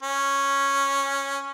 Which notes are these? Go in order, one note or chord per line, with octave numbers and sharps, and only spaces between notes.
C#4